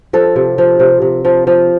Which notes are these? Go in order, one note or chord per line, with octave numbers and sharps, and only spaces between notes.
F3 A4
C3
F3
C3
C3
F3
F3